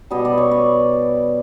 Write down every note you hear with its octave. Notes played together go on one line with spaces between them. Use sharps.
B2 G3 D#5
D5
C#5
D5